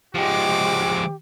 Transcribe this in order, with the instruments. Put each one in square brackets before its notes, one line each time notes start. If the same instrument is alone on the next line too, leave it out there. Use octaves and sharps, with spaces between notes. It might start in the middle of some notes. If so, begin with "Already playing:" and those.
[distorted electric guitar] F3 G#3 [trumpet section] F#4 D6 [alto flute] G4